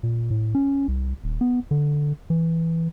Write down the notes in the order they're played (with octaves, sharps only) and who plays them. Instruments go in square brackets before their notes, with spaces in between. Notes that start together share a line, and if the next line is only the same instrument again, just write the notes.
[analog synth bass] A#2
A2
C#4
C2
D#1
B3
D3
E3